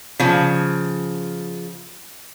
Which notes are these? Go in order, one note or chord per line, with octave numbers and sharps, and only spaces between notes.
C#3 F3